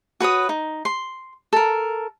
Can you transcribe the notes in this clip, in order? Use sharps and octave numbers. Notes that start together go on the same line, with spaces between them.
F#4 B4 C#5 D#6
D#4
C6
A4 A#4